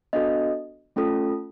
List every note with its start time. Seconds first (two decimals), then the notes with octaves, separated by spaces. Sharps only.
0.13 B3 D4 F#4 A4 D#5
0.96 A3 C#4 F4 A4